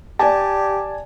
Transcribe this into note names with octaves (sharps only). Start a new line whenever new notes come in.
G4 D5 G#5 A5